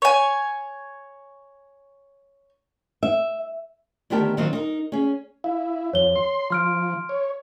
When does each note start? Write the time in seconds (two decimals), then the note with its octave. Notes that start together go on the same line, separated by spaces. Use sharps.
0.02 C#5 G#5
3.03 E5
4.10 D2 D#3 B3 G4 A#4 A5
4.37 D#3 F#3 C4 F4 A#4 D#5
4.53 D#4 A#4
4.92 C#4 G#4
5.44 E4 F5
5.93 F2 C#5 G7
6.16 C6
6.50 F3 C6 F6 D7
7.09 C#5